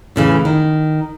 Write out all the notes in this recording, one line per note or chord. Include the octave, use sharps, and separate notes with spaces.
A2 C#3 E3
D#3